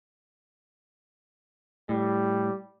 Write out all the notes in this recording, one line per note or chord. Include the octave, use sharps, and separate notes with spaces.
A2 G3